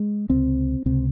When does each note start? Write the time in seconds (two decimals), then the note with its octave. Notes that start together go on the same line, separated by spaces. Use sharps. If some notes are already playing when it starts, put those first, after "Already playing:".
Already playing: G#3
0.29 C#2 C3 C4
0.86 C#2 C3 C4